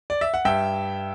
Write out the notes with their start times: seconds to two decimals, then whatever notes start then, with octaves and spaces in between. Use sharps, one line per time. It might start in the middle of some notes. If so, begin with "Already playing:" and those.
0.10 D5
0.21 E5
0.34 F#5
0.45 G2 E5 G5